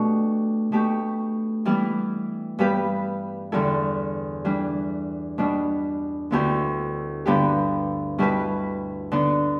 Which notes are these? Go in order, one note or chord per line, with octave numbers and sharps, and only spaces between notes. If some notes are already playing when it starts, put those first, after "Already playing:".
Already playing: B2 A3 D4 G4
B2 A3 G4
E3 G3 B3 E4
G2 G3 B3 G4 B4
E2 D3 G3 E4 A4
E3 G3 D4
B2 G3 B3 D4
D2 D3 B3 E4 G4
G2 D3 B3 E4 G4
B2 G3 E4 G4 B4
D3 B3 D4